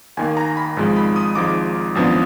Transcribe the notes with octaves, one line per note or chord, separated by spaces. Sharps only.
D#2 D#3 A#3 G#5
A#5
B5
G#1 G#2 F3 G#3
B5
D#6
G#1 G#2 F3 G#3 D6
G#1 F#2 F3 B3 D4